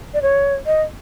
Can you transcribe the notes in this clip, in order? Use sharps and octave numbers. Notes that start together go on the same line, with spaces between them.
D5
C#5
D#5